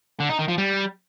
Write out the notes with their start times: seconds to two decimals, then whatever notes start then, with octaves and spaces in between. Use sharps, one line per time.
0.20 D3
0.29 D#4
0.39 D#3
0.48 F3
0.58 G3